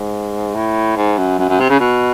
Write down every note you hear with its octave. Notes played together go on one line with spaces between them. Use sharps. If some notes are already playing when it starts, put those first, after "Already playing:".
Already playing: G#2
A2
G#2
F#2
F#2
F#2
C3
C#3
B2